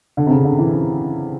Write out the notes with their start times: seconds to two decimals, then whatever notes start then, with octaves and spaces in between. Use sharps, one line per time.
0.17 D3
0.27 C3
0.31 C#3
0.45 D3
0.58 E3